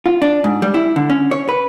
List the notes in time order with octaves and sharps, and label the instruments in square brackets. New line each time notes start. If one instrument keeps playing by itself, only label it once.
[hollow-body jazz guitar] F4
D4
G#2
G3
E4
D3
C#4
C#5
B4